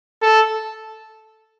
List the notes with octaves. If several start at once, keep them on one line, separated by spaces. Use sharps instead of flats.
A4